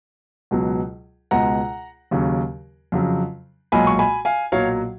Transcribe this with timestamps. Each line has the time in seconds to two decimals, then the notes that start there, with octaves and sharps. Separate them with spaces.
0.51 C#2 B2 F#3
1.31 C#2 B2 G#3 F#5 A#5
2.11 D#2 C#3 F#3
2.92 F2 C#3 F#3
3.72 B1 A#2 G#3 G#5 B5
3.87 C#6
3.99 G#5 B5
4.25 F5 G#5
4.52 B1 A#2 F#3 C#5 F5